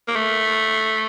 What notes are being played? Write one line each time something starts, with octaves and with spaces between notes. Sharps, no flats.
A#3
A3